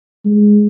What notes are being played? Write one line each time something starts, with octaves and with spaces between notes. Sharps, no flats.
G#3